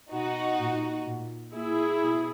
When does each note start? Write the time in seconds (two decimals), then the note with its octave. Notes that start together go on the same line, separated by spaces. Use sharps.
0.13 B2 D#4 F#4
0.60 A#2
1.07 A#2
1.54 A#2 E4 G#4
2.02 B2